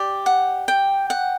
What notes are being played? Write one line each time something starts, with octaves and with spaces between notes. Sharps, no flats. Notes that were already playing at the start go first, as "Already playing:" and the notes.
Already playing: G4 D5
F#5
G5
F#5